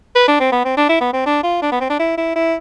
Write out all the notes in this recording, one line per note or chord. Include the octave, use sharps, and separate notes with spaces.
B4
D4
C4
B3
C4
D4
E4
B3
C4
D4
F4
D4
B3
C4
D4
E4
E4
E4